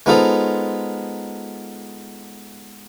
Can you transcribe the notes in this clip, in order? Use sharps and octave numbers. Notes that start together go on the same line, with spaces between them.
G#3 B3 D#4 F4 A4 C5